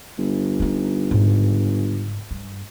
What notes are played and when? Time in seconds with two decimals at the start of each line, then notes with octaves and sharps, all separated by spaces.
0.18 G1
0.60 C4 D#4
1.11 G#2 C#3
2.31 G2